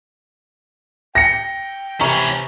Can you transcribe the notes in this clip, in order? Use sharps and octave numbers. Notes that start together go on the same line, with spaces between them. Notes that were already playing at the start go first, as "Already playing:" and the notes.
G5 A#6 C#7
C3 E3 C#4 A#5 C#6